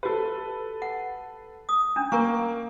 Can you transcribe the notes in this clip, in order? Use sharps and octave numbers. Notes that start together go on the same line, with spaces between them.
F#4 G4 A4 B4
F#5
D#6
C#4 D4
A#3 A#4 A#5 C#6